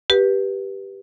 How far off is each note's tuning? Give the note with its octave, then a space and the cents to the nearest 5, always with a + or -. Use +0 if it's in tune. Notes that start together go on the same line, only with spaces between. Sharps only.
G4 +0 B4 -20